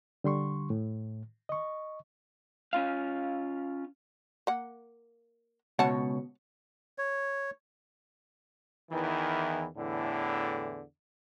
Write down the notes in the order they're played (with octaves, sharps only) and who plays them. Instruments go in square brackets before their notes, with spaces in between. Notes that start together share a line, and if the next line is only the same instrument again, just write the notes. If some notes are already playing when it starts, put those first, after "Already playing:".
[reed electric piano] D3 G3 C6 C#6
A2
D#5 C#6
[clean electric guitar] C#4 F4 F5
[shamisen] A#3 F#5
[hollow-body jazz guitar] C#2 B2 C#5 [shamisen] F#5 A5
[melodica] C#5
[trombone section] E2 D#3 E3
E2 A2 D3 E3